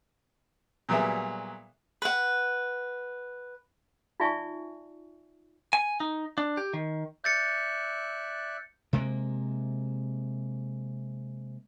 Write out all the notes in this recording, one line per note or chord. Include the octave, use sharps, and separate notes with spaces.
A#2 F#3 G3 B3 G#4 E5
B4 F#5
D#4 F4 D5 E5 G#5 C#6
G#5
D#4
D4
G4
D#3
D5 E5 F#6 G6 A6 C#7
C3 G#3 A#3